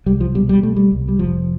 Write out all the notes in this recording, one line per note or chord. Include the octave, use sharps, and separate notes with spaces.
C2 G3
F3
B2 G3
G3
B2 A3
G3
C2
G3
F1 F3